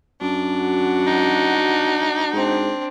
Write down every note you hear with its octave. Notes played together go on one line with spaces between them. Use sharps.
F#2 D4
F#4 F#5
D#4
G#2 C4 D4